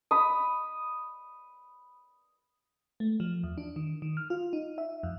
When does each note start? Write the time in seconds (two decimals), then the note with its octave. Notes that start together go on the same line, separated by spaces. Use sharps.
0.11 B5 D#6
3.00 A3
3.20 F3
3.43 E2
3.58 D4
3.76 D#3
4.02 D#3
4.17 F6
4.30 F4
4.53 D#4
4.78 E5
5.03 F2